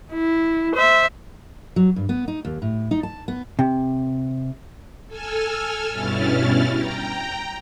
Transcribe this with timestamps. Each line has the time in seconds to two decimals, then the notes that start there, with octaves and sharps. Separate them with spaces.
0.13 E4
0.76 C5 E5
1.76 F#3
1.96 G2
2.09 B3
2.28 D#4
2.45 D#2
2.62 A2
2.91 D#4
3.03 A5
3.28 B3
3.59 C3
5.08 A4 G#5 E6 F6
5.91 G2 B2 C#4 E4 F6 A6
6.75 G5 A#5